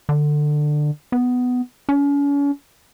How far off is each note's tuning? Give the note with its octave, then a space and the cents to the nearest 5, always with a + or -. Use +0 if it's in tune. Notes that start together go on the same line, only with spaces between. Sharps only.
D3 +20
B3 +10
C#4 +40